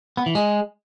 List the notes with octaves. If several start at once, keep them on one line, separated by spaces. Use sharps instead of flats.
B3
E3
G#3